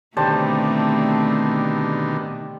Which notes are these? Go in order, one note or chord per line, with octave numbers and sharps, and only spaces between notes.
B2 D3 D#3 G3 A3 C4 C5 A5